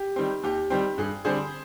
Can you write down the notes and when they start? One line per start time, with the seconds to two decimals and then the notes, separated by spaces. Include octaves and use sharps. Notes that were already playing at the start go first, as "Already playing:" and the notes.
Already playing: G4
0.16 D#3 G3 C4
0.43 D#2 G4
0.70 D#3 G3 C4
0.98 G2 G#4
1.25 D3 G3 C4 G#4 C5